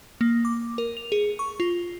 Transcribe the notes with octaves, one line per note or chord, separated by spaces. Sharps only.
A#3
D6
A#4
F7
G#4
C#6
F4